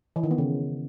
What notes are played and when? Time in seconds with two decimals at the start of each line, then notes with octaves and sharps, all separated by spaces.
0.16 E3
0.23 D#3
0.31 B3
0.38 C#3